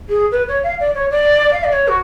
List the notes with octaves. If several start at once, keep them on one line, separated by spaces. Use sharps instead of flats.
G#4
B4
C#5
F5
D5
C#5
D5
F5
D5
C#5
F#4